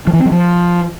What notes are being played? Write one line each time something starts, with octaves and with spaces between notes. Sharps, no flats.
F3
E3
C4
F#3
F3